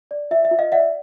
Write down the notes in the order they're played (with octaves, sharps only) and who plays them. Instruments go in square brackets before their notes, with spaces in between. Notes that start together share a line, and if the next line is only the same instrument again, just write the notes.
[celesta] D5
F4 E5
E5
F4
D#5 F5
D5 E5 F#5